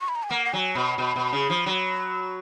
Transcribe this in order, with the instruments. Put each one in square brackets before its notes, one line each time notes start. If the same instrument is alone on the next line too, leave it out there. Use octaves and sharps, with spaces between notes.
[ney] C#6
B5
A#5
G#5
[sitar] A#3 [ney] F#5
[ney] F#5
[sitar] F#3 [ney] G#5
[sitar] B2 [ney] B5
[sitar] B2
B2
C#3
F3
F#3